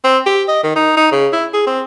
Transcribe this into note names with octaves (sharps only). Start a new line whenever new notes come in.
C4
G4
D#5
D#3
D#4
D#4
C#3
E4
G#4
C4